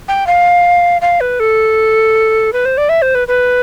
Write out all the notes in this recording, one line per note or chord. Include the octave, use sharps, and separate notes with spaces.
G5
F5
F5
B4
A4
B4
C5
D5
E5
C5
B4
B4